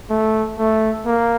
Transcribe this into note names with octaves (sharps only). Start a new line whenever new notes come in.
A3
A3
A#3